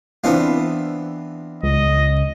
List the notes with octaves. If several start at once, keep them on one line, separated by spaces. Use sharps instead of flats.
E3 B3 C4 D4 E4 F4
C#2 D#5